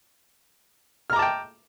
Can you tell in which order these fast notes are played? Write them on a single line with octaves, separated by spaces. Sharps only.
F6 A#5 D6 A5 G5